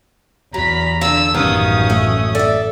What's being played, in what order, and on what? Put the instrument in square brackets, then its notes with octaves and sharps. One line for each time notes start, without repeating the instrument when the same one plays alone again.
[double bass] E2 [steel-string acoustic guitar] F#3 [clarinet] A#5 [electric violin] B5 B6
[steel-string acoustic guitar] D3 F4 [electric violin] E6
[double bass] A1 F#2 [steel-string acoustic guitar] D#3 G3 B3 [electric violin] C#4 D#6 [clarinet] F5
[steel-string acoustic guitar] A3
[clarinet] A4 [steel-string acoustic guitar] D5 E5